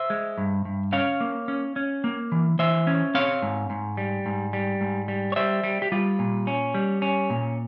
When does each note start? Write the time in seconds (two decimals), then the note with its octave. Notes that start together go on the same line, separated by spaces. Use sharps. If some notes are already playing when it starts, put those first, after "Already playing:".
Already playing: C5 E5
0.10 G#3
0.38 G2
0.65 G2
0.93 C#4 C#5 F5
1.21 A#3
1.48 C#4
1.76 C#4
2.04 A#3
2.32 E3
2.59 E3 C5 E5
2.87 C#4
3.14 C4 C#5 F5
3.42 G#2
3.70 G#2
3.97 G3
4.26 G#2
4.53 G3
4.81 G#2
5.08 G3
5.32 C#5
5.36 G3 C5 E5
5.64 G3
5.82 G4
5.92 G3 F4
6.19 A#2
6.47 C#4
6.74 G3
7.02 C#4
7.30 A#2